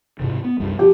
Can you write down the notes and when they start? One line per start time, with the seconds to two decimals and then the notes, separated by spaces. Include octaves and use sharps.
0.19 G#2 C3 D#3
0.44 B3
0.60 C2 F#2 G3
0.79 F3 G4